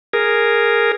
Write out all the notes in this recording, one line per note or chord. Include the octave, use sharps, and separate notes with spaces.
G#4 A#4